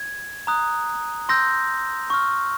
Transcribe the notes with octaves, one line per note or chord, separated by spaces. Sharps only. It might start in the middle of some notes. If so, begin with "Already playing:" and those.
Already playing: G#6
A#5 D#6 F#6
C6 E6 G6 A#6
C#6 F6